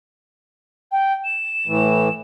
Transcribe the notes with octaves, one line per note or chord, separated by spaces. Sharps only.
G5
E7
A2 E3 A3